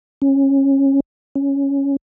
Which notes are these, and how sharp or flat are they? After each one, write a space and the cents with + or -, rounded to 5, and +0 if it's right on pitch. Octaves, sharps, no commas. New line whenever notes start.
C#4 -20
C#4 +0